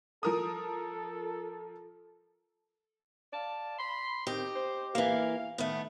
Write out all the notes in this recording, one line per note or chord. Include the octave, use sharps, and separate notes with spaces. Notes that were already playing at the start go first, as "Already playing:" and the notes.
F3 A4 A#4 D#6
D5 F5 A5
B5 C6
D#3 C4 G4 D#5
C5
E3 A#3 F5
D#3 A3 B3